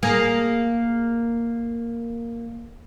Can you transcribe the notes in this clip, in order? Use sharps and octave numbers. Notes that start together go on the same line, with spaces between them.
A#3 G#4